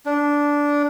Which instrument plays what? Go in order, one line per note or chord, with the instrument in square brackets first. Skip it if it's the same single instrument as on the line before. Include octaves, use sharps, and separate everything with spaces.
[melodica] D4